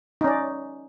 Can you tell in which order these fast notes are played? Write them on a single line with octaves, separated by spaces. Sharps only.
D#4 C#4 D5